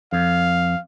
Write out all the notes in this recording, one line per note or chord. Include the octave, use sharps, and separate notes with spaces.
F2 F5